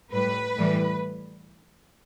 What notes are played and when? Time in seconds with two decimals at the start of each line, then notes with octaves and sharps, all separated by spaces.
0.12 A2 G3 B4
0.57 A2 E3 G3